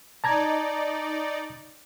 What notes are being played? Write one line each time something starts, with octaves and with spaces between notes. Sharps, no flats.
D#4 D5 A5 A#5 G#6